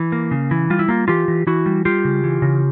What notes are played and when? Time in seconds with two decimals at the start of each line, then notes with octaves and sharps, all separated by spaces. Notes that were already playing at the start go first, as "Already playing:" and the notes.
Already playing: E3
0.12 A#3
0.31 C#3
0.51 E3
0.70 G3 F4
0.79 E4
0.89 A#3 F4
1.08 E3 F4 G4
1.28 E3
1.47 E3 E4 F#4
1.66 G3
1.85 G3 F4 G4
2.05 C#3
2.24 E3
2.42 C#3